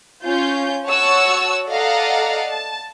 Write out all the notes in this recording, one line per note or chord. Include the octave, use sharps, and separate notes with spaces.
C#4 F4 G6
F#4 C#5 F#5 A5 C#6 E6
A4 D5 D#5 F5 F#5 A#5
A5